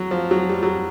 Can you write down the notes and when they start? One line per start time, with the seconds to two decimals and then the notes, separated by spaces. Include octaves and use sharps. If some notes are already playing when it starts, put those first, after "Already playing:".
Already playing: F#3
0.11 F3
0.31 F#3
0.49 G3
0.63 F#3